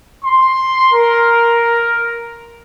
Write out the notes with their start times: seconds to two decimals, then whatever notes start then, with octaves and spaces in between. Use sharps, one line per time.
0.24 C6
0.93 A#4